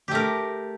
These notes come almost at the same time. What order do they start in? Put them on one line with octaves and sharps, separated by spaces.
G4 A3 A#4